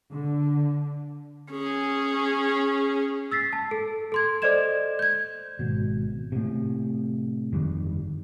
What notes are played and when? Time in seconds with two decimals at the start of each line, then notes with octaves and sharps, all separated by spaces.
0.11 D3
1.51 C#4 G#4
3.31 E6 A6 B6 C7
3.53 A5
3.71 A4
4.12 A4 C6 G#6
4.42 A4 C5 D5 D#5 G#6 E7
4.99 G6 G#6
5.59 G#1 B2
6.32 A2 C3
7.52 G1 F2 D#3 G3